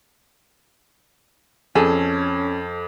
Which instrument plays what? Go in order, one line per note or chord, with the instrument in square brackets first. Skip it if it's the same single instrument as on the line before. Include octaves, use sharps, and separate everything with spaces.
[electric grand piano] F2 [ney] C#4 [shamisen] G#4 [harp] A4